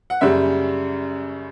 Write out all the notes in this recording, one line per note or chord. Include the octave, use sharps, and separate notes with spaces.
F#5
F#2 C#3 G3 E5